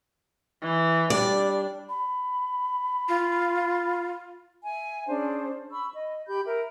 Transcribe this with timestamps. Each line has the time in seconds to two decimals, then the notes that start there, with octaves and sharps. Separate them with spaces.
0.62 E3
1.10 G3 D4 D5
1.89 B5
3.09 F4
4.63 E5 G#5
5.08 C#4 D4 G#4 C5
5.71 B5 C#6 E6
5.93 D#5
6.27 G4 B5 G6
6.46 A#4 E5